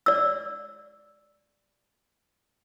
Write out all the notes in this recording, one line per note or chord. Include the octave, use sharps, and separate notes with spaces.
D5 E6